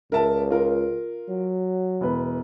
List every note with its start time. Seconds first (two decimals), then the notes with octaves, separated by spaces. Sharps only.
0.12 C#2 A#4 E5 A5
0.50 F4 A#4
1.29 F#3
2.01 E1 B4